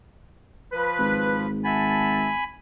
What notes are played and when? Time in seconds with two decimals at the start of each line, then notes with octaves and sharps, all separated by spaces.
0.73 F3 B4
0.99 G#1
1.64 E5 F#5 G#5 A5 B5